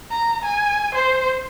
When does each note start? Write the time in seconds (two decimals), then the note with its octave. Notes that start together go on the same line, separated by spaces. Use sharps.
0.11 A#5
0.45 G#5
0.94 C5